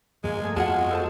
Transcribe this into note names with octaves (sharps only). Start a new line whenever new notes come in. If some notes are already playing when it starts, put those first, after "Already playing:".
G2 F3 G#3 A#3 G#4
A3 A#3 G#5
F2 G#3 B3 F4 F#4 F#5 A5
A4 C5 A5